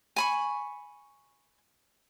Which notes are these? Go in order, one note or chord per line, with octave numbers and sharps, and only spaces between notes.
G#5 B5 C#6